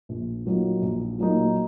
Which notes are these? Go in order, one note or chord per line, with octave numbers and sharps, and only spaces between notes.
A#1
A#2 F#3 A#3 D#4
A#1
A#2 F#3 A#3 D#4